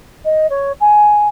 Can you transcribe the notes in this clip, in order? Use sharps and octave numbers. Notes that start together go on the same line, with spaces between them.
D#5
C#5
G#5